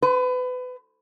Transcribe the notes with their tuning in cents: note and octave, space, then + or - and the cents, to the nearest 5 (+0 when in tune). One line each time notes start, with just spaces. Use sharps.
B4 +30